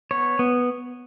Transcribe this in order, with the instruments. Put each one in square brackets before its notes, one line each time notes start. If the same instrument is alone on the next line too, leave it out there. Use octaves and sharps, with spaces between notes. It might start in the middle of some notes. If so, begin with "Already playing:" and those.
[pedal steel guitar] B3 C#5
B3